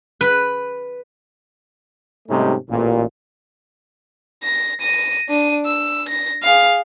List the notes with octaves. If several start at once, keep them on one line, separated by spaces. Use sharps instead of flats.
B4
G#2 C3 G3 A3 C#4 D#4
A1 A#2
A#6
A#6 D#7
D4 D#7
E6
A#6
G#4 F5